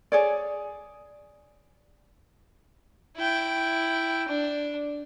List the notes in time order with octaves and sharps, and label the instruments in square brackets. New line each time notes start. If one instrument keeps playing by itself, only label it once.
[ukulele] G#4 C#5 D5
[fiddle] E4 G5
D4